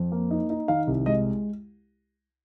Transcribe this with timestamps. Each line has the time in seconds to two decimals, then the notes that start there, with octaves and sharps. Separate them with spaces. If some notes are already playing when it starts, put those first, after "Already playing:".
Already playing: F2
0.12 A#3
0.31 D#4
0.50 D#4
0.68 D#3 F5
0.87 C2
1.06 G#3 D#5